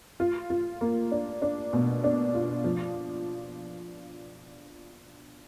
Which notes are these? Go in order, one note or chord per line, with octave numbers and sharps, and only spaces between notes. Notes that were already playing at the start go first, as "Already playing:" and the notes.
F4
F4
A#3
D4
D4
B2
D4
F4
F3